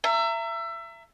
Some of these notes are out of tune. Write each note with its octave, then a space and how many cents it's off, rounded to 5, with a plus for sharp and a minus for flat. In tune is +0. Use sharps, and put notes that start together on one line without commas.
E5 +25 A#5 -20